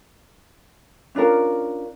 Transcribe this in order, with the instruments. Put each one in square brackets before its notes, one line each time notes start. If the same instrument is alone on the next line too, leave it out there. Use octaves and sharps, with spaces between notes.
[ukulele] C#4 D4 F4 A#4